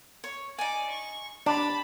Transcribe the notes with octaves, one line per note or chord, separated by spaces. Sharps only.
C#5
D#4 D5 G#5
C#6
D4 G4 A5 B5 C6